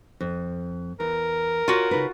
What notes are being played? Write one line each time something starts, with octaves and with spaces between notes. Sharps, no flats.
F2
E2 A#4
F4 F#4 C#5
C#3 D#4 B4